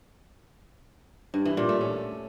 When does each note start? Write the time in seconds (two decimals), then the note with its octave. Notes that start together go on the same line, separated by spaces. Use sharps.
1.34 G2
1.45 E3
1.57 A#2
1.69 A3
1.81 C#4